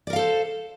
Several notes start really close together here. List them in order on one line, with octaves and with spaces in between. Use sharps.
D5 A#4 F5 A4 C5